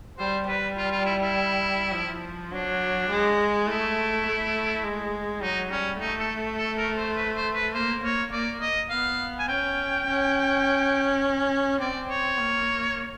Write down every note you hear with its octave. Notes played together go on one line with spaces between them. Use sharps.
G3 C5
G3 B4
F4
F4
E4
E4
F3
F#3 D4
G#3
A3 E4
A3
G#3
F#3 D#4
G3 C#4
A3 D#4
A4
A4
A#4
C5
B4
C5
B4
A#3 C5
A#3 C#5
A#3 D5
D#5
B3 F5
G#5
C#4 G5
C#4
C4 D5
C#5
A#3